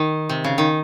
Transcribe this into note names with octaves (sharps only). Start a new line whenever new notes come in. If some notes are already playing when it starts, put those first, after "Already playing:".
Already playing: D#3
C3
C#3
D#3